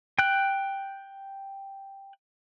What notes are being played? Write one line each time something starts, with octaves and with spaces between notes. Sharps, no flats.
G5 F#6